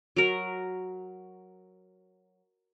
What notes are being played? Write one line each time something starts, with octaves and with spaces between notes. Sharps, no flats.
F#3 A#4